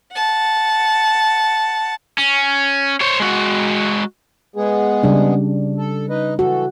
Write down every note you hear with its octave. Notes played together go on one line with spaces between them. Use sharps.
F#5 A5
C#4
C5 C#5
G#3 F#4
G#3 B3 G#4
C#3 G3 D4
A4
D#4 B4 D#5
E3 F#4 A4